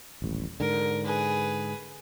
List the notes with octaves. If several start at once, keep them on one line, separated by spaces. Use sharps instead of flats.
D#1 A1
G#2 D3 A#4
G#4 B4